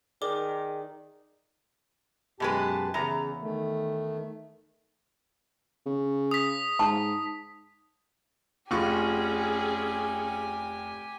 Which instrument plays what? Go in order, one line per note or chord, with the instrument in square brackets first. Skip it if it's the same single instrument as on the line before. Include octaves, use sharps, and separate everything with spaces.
[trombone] D#3 [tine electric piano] G#4 D5 [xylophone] A#4 D6
[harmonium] F#2 G4 A5 [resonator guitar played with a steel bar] B2 G#3 B4
[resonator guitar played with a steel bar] E2 A#5 [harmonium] C#3
[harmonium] D#3 A3
[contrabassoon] C#3
[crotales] D#6 B6
[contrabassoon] G#2 [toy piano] A5
[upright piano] F1 F4 C#6 [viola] C#4 G#4 [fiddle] G4 G#5